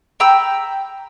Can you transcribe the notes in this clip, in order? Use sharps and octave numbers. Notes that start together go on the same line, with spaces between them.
G5 A#5 B5 E6